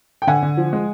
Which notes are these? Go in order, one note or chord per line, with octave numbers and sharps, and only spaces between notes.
G5
D3 F#5 G#5
D3
F3
G#3